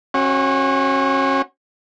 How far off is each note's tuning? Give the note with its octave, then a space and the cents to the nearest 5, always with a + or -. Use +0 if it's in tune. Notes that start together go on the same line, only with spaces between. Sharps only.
C#4 -35 F#4 +0